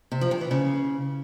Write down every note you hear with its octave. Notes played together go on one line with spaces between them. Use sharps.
C3
F3
G2
E3
C#3